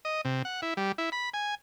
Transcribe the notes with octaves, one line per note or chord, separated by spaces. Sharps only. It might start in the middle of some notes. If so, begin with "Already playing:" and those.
D#5
C3
F#5
E4
G3
E4
B5
G#5